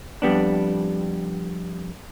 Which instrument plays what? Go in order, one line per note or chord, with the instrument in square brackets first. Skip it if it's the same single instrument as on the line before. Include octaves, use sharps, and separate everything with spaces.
[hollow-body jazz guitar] F2 G3 B3 D4